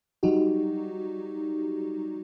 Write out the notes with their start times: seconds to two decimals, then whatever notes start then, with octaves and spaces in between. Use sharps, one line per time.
0.23 F#3 G3 D#4 F#4 G4